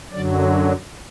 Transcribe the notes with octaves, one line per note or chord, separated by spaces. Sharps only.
F#2 D3 F#3 D5